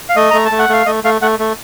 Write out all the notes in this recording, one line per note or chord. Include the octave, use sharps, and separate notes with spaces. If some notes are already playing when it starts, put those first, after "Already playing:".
F5
A3 D#5
A3 A#5
A5
A3
F#5
A3 F5
A3 D#5
A3 F5
A3 F#5
A3